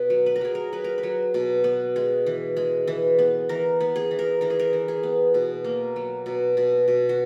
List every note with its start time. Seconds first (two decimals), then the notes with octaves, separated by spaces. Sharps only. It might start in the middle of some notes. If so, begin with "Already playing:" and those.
Already playing: B2 B4
0.10 F#3
0.26 B4
0.36 A#4
0.41 F#3 G#4
0.55 A#4
0.72 F#3 B4
0.84 A#4
0.98 B4
1.03 F#3
1.34 B2
1.64 B3
1.96 G#3
2.26 E3
2.57 G#3
2.87 E3
3.19 B3
3.49 E3 A#4
3.80 B3
3.96 G#4
4.11 E3
4.19 A#4
4.41 E3 A#4
4.50 G#4
4.59 A#4
4.73 E3
4.88 G#4
5.03 B3
5.34 B2
5.64 A#3
5.96 F#3
6.26 B2
6.57 B2
6.88 B2
7.09 F#4